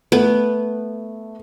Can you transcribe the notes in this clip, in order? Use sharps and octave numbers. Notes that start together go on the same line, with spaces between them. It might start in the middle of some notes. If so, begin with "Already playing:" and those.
A3 B3